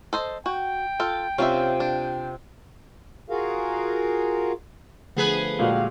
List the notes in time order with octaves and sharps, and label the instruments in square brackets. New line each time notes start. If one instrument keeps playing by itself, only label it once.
[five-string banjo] A4 C5 D#5
[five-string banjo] F#4 [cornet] G5
[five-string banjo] F4 A4
[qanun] C3 F4 [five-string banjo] C#4 D4 E5
[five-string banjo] D4
[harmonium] F4 F#4 G#4 A#4 F5
[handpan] D3 F3 A3 [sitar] B3 G#4 B4
[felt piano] A#2 G#3 [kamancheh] F#4 F5 [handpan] G4 A4